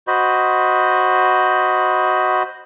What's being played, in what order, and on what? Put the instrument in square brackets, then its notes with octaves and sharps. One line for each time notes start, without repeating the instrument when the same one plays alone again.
[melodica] F#4 C5 D#5 B5